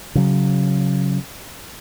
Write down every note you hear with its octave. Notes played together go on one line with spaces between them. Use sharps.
C#3 F#3